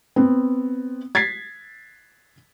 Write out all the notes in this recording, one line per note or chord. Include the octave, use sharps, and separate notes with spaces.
B3 C4
G#6 A6 B6 C7